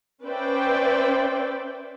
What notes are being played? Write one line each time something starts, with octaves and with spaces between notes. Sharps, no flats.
C#4 B4 C5 D5 E5 G5